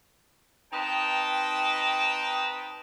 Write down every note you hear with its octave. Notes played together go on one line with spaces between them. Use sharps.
C4 D#4 B4 D#5 G5 A5